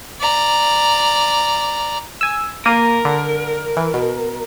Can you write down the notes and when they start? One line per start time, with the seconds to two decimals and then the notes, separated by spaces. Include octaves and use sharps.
0.20 D5 A#5
2.21 G#5 E6
2.66 A#3 A#4 D#7
3.05 D3
3.77 E3
3.94 B2